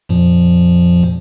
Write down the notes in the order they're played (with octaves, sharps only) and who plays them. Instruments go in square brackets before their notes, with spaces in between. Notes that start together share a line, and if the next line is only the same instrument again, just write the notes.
[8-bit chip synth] F2 A#2 F3